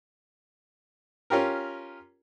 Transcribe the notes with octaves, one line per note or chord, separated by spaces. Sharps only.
C#4 F4 G4 A#4